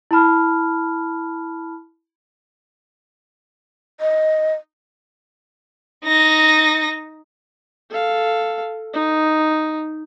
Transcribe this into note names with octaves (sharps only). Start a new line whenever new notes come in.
E4 A5 B5 F6
D#5
D#4 A#6
A4 F5
D#4